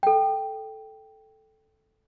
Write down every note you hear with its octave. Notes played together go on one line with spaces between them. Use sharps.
A4 G5